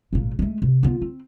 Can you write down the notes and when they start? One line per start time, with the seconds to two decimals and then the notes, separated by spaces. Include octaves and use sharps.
0.13 G#1 A#2
0.39 G#3 A3
0.62 C3
0.83 B3 F4
1.01 C4